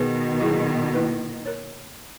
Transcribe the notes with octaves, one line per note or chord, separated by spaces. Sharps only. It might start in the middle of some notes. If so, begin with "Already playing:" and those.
Already playing: B2 D#3 B3 D#4 G#4 B4
F#3 A#3 E4 G#4
A#3 E4 B4
A#4 C#5